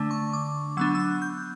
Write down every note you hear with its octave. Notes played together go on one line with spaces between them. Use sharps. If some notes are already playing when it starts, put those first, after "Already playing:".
Already playing: D3 A3 D4
C#6
D6
F#3 B3 D4 E6
E6
F#6
G6